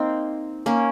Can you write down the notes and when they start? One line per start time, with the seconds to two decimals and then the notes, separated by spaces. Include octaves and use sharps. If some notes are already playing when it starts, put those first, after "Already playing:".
Already playing: A#3 C4 D#4
0.66 A#3 C#4